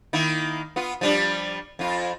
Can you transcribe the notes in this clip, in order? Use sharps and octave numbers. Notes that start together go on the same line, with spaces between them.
D#3 A#3 E4
B3 F4
F3 G3 D4
F2 F4